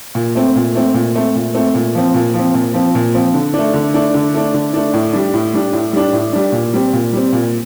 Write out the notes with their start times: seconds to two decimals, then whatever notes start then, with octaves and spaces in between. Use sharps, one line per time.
0.15 A#2
0.35 A3 C4
0.56 A#2
0.75 A3 C4
0.94 A#2
1.15 A3 C4
1.35 A#2
1.54 A3 C4
1.75 A#2
1.95 F3 C4
2.14 A#2
2.34 F3
2.39 C4
2.54 A#2
2.74 F3 C4
2.95 A#2
3.15 F3 C4
3.34 D3
3.53 D4
3.59 A3
3.74 D3
3.94 A3 D4
4.14 D3
4.34 A3 D4
4.54 D3
4.73 A3 D4
4.94 A2
5.13 G3 D4
5.34 A2
5.54 G3 D4
5.73 A2
5.93 G3 D4
6.13 A2
6.33 G3 D4
6.52 A#2
6.74 G3 C4
6.93 A#2
7.13 G3 C4
7.33 A#2